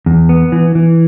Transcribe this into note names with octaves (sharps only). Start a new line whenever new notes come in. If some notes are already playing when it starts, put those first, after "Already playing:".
E2
B3
E3
E3